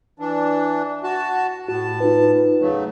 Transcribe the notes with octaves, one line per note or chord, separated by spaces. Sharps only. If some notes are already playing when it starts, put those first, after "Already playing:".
E3 D4
F#4 A5
A2 F#4 A5
D#4 F4 B4
C#3 F#3 A3